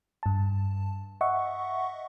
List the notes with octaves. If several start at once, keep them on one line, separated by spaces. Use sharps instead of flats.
G2 A5
D#5 E5 F#5 C#6